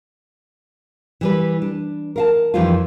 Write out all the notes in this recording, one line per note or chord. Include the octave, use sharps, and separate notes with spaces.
E3 G3 B4
D4
A#4 F5 A5
F2 D#3 E3 G3 C4 F4